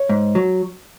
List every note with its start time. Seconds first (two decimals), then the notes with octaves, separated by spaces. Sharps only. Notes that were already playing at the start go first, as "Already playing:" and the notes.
Already playing: C#5
0.09 G#2
0.35 F#3